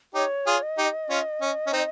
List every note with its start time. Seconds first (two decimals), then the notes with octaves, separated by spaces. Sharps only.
0.15 D#4 G4 C#5
0.47 F4 G#4
0.62 D#5
0.78 D#4 G4
1.10 C#4 F4
1.41 C#4
1.67 C#4
1.73 C4 D#4